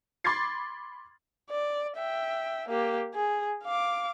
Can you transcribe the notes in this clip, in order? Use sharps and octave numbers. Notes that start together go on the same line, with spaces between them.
B5 C6 D6 G#6 A6 C7
D5
E5 G5
A#3 G4
G#4
F5 D6